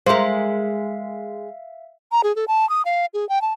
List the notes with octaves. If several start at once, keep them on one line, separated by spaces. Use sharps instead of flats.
G#3 A#4 C5 E5 F5
A#5
G#4
A4
A5
D#6
F5
G#4
G5
A5